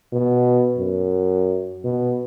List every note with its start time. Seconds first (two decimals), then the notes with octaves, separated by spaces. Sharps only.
0.13 B2
0.78 F#2
1.84 B2